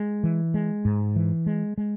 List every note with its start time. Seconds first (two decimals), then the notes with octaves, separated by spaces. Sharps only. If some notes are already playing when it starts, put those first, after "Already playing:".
Already playing: G#3
0.24 E3
0.54 G#3
0.85 G#2
1.16 E3
1.46 G#3
1.78 G#3